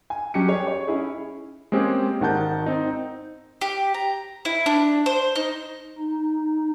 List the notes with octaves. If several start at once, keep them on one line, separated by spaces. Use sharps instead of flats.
G#5
F#3 C#4 G4 C#7
G#4 C#5
C#5
C#4 D#4 E4 G#4
G#3 A#3 C4 C#4 G4 G#4
G#1 D#3 F#5 A5 G6
C4 D#4
G4
A#5
E4
D4
C5
D#4
D#4